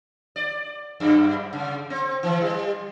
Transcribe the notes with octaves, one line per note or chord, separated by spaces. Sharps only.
D5
F#2
C#3
C4
E3
G3